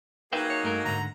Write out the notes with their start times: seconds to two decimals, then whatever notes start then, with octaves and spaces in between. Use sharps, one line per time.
0.33 F#3 A#3 D#4 G#4 B4 E5 G5
0.50 C#5
0.63 G2 A3 A#4
0.85 D2 G#2 D3 A#5